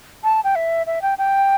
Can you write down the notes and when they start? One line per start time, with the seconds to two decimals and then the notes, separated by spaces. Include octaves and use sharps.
0.24 A5
0.44 G5
0.56 E5
0.87 E5
1.02 G5
1.18 G5